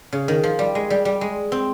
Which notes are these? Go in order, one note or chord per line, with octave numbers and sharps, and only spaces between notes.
C#3
D#3
F3
G3
G#3
G3
G3
G#3
C4